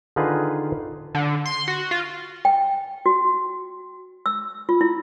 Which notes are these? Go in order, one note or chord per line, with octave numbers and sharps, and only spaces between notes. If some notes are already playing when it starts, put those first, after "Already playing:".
D3 D#3 D#4 F4 G#4 B4
D3
C6
F#4
F4
G5
F#4
E6
F4
E4